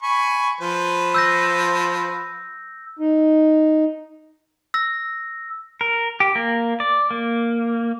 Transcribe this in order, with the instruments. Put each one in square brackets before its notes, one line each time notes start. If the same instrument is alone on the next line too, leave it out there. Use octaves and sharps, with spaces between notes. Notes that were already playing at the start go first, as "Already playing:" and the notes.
[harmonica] G#5 B5 C#6
F3 B4 C5
[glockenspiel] E6 G6 A#6
[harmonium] D#4
[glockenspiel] E6 A#6
[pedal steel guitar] A#4
G4
A#3
D5
A#3